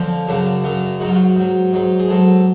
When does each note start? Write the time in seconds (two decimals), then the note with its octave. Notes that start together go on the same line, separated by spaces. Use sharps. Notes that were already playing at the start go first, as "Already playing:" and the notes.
Already playing: F2 D3 F3 C#4
0.28 F#2 C#3 F#3 D4
0.64 F#2 C#3 F#3
1.00 G#2 F#3 F#4
1.07 F4
1.15 F#4
1.36 G#2 F#3
1.73 G#2 F#3
1.99 G#4
2.09 G#2 F#3 A4